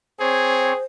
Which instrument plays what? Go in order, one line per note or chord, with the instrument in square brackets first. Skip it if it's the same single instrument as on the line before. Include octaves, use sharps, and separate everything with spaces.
[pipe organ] C4 C#5 [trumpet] G#4 [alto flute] C5